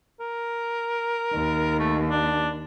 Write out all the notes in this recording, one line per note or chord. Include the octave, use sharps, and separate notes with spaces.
A#4
D#2
A3
D4